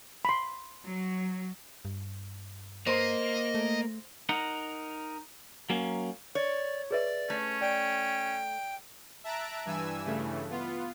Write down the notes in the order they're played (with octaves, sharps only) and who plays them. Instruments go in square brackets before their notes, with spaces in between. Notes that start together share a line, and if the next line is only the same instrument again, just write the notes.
[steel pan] B5 C6
[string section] F#3
[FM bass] G2
[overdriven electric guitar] A#3 [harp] C5 C6 [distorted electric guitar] D#5
[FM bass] A3
[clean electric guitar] D#4 A#4 F#5
F#3 A#3 C#4
[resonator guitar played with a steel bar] C#5 [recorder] D5
[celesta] G#4 B4 E5 [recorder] D5
[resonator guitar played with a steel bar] A3 [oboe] C#4
[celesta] D5 [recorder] G5
[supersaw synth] E5 A5 A#5 F#6 D7
G2 E3 G#5 E6
G2 C#3 E3 A3
B3 F4